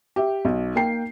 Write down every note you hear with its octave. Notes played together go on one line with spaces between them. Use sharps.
G4 E5
B1
A#3 G5 C7